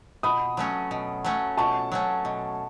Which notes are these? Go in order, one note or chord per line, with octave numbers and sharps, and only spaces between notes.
B2 B5 D#6
F#3 A3 C#4
B2
F#3 A3 C#4
B2 A5 C#6
F#3 A3 C#4
B2